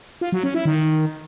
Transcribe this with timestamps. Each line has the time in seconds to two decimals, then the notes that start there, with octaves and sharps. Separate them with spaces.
0.21 F4
0.32 F#3
0.43 C#4
0.54 E4
0.65 D#3